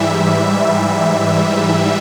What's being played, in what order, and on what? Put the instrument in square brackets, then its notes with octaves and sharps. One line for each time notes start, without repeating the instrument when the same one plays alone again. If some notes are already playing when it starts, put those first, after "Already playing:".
Already playing: [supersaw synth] G#2 E3 G3 E5